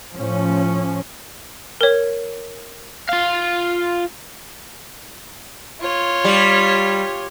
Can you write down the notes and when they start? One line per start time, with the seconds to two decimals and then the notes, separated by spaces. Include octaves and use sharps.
0.15 A2 F3 C#4
1.81 A#4 C#5
3.09 F4 F5
5.81 F4 C#5
6.25 G3